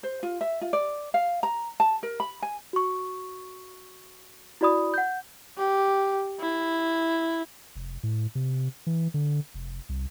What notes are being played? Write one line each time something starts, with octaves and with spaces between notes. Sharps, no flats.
C5
F4
E5
F4
D5
F5
A#5
A5
A#4
B5
G#5
F#4 C#6
E4 F#4 D5 B5 D#6
F#5 G6
G4
E4
F1
A2
C3
E3
D3
F1
C2